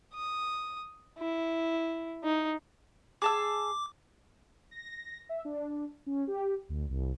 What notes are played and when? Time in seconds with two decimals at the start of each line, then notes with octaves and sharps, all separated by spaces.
0.14 D#6
1.19 E4
2.23 D#4
3.22 G#4 A5 D6 E6
4.71 A#6
5.29 E5
5.45 D4
6.06 C#4
6.27 G4
6.69 D2
6.89 C2